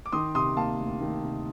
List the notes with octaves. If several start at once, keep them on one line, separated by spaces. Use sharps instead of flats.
D6
D#3 C6 D#6
C3 C6 D#6
A#3 F5 A5
D2
D#3
C3